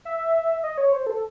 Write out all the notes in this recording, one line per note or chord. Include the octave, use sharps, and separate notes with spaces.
E5
D#5
C#5
C5
A4